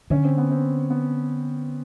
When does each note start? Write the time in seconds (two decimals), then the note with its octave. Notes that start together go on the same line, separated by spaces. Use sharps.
0.10 D3 C#4
0.24 C4
0.38 B3
0.51 C4
0.90 B3